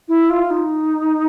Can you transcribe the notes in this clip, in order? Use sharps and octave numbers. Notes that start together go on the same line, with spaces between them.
E4
F4
D#4